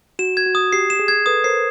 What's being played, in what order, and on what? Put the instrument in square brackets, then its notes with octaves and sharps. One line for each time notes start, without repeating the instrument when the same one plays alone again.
[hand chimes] F#4 [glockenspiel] E7
[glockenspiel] G#6
[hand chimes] F#4
[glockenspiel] D#6
[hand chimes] G4 [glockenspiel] C7
[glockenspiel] E7
[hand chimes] G#4
[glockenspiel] G#6
[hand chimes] A4 B4 [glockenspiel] D#6
[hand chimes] A#4 C5 [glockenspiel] C7